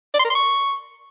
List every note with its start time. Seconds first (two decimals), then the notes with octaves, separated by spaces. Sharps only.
0.14 D5
0.19 C6
0.25 A#4
0.30 C6
0.35 C#6